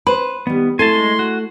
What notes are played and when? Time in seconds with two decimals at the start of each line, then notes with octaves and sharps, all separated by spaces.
0.07 B4 C5
0.47 D#3 G3 B3
0.79 A3 E4 A4 G#5 A5 C6
0.93 G#3
1.19 F#4